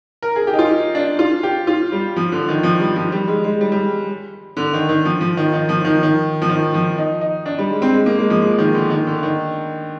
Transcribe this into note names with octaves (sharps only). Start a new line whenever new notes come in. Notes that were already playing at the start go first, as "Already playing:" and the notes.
A#4
G#4
G4
D#4
F4
D#4
D4
F4
G4
F4
G3
F3
D3
D#3
F3
G3
F3
G3
G#3
G#3
G3
G3
D3
D#3
D#3
F3
F3
D#3
D#3
F3
D#3
F3
D#3
F3
D#3
F3
D#4
D#4
D4
G3
G#3
C4
G#3
A#3
G#3
F3
G#3
D#3
D3
D#3
D3
D#3